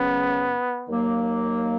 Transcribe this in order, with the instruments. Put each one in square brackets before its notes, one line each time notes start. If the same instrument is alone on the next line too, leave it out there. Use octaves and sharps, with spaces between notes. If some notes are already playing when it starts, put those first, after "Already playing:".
Already playing: [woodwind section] F#2 C#3 F#3 C#4 [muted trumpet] B3
[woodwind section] D#2 D#3 F#3 A#3